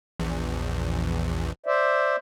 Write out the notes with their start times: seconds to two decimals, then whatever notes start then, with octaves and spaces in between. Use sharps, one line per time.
0.20 A#1 E2
1.66 C5 D5 E5